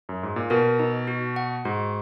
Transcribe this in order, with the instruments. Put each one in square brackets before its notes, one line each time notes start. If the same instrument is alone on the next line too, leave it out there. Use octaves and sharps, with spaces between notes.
[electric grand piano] F#2
G#2
A#2
[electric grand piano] B2 [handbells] A#4
[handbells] D#4
F#4
F#5
[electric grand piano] G#2 [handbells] F#4